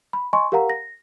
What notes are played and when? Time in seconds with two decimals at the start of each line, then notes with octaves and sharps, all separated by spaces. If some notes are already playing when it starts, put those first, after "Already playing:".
0.13 B5
0.33 D#5 G#5 C6 C#6
0.52 G4 A#4 F5 F#5 A#5
0.70 A#6